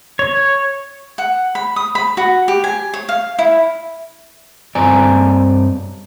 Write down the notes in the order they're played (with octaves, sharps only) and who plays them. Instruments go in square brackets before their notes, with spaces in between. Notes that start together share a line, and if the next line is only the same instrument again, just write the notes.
[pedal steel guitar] C#5
[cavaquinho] F#5
B5
D#6
B5
F#4
G4
G#5
C#5
F5
E4
[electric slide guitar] G2 C4 D5 G#5 A#5